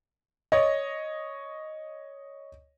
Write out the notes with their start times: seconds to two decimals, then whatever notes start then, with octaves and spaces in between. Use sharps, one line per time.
0.52 C#5 D#5